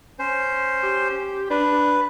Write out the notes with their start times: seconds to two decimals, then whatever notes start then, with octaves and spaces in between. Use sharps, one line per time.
0.19 C#4 C5
0.83 G4
1.50 D4 B4